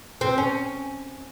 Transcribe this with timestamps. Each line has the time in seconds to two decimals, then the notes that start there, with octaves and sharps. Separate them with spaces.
0.21 C4
0.38 C#4